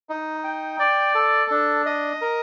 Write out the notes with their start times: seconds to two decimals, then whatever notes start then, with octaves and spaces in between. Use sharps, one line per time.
0.09 D#4
0.44 G5
0.79 D5
1.15 A4
1.51 D4
1.86 D#5
2.21 A#4